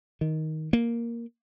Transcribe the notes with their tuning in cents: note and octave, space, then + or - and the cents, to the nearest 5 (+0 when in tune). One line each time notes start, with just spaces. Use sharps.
D#3 +10
A#3 +5